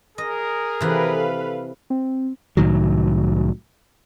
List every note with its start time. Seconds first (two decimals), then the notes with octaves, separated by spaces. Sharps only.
0.18 G#4 A#4 D#5
0.81 C3 E3 A4 B4 F5
1.90 C4
2.57 C2 A2 D#3 F#3